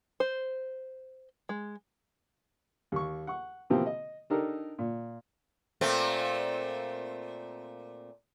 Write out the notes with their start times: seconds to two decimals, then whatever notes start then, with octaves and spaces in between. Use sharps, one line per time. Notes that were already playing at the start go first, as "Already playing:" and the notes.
0.20 C5
1.49 G#3
2.92 D#2 C#6
3.27 F#5 C#6
3.70 B2 E3 F3 A#3 C4 G4
3.86 D#5
4.30 D4 D#4 G4 A4 A#4
4.79 A#2
5.81 A#2 A3 C4